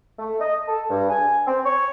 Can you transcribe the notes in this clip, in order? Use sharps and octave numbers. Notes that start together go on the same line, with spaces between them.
A3
D#5
A4
G2
G#5
C4
C#5